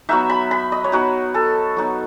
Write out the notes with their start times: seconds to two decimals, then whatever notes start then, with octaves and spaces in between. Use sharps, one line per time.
0.09 F#3 B3 D#4 E5
0.30 B5
0.51 B5
0.72 D#5
0.84 C#5
0.92 F#3 B3 D#4 B4
1.34 A4
1.77 F#3 B3 D#4